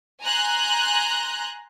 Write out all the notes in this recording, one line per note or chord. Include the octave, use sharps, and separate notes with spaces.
G#5 A#5 C6 F#6 G6